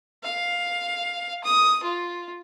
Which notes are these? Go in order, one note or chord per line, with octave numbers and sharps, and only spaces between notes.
F5
D#6
F4